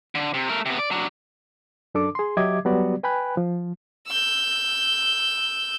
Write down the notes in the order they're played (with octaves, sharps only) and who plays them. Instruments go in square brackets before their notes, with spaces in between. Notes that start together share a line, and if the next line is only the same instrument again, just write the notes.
[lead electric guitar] D3
C3
A3 A#4
C3 B3
D5
F#3 D4
[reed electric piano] F#2 D4 A4 D6
G#4 C6
F#3 G4 D#5 E5 D6 G#6
F#3 G3 B3 F#4 G4 D5
B4 G5 G#5 B5 F#6
F3
[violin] E6 G6